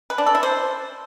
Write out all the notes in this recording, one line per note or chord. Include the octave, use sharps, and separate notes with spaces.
B4
D4
A4
E4
C5